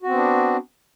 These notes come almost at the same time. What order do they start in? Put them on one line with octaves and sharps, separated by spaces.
F#4 C4 B3 D4